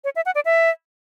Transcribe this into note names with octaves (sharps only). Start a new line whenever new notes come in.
C#5
E5
F#5
D5
E5